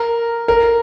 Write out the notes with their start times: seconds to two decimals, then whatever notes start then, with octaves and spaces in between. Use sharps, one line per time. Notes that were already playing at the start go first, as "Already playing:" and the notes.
Already playing: A#4
0.48 A#4